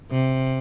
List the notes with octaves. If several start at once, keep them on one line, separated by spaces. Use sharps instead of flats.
C3